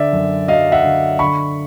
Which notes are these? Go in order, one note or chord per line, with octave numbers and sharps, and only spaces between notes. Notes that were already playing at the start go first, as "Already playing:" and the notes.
Already playing: D3 D5 E5
F#2
F#3 D#5 F5
E5 F#5
D3
D3 B5 C#6